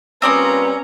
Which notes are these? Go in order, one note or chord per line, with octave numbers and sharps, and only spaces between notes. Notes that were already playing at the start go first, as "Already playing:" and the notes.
A#2 G3 C4 C#4 B4 D5 A#5 D#6